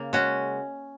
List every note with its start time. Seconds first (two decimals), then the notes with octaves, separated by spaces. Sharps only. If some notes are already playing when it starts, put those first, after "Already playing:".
Already playing: C#3 A#3
0.13 G#3 C#4 F#4